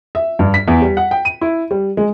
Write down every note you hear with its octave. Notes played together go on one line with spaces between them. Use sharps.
E5
G2
B6
E2
G3
F#5
G5
D#7
E4
G3
G#3